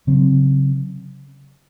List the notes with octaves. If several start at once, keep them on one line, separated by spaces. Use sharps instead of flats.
C#3 F#3 C4